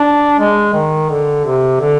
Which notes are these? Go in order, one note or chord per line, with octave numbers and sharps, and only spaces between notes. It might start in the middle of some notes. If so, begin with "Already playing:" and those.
Already playing: D4
G#3
D#3
D3
C3
D3